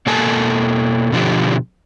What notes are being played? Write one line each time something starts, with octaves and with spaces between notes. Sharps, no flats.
B2 A#3 A4 G#5 A5
B2 D3 F3 G4